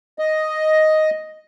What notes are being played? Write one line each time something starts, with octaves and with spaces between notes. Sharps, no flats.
D#5